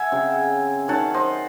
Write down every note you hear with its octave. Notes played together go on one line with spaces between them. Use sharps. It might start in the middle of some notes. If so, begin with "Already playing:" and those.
Already playing: E5 F#5 G#5
C#3 F#3 C4
D#3 F#3 C#4 F#5 A5
C5 D#5